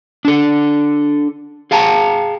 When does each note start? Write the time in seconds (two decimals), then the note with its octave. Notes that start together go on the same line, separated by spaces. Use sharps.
0.25 D4 A4
1.71 G#4 F5 G5 A5 A#5